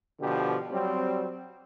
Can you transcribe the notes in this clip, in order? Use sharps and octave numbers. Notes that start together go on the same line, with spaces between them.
B2 D3 F3 G4
F#3 G3 C4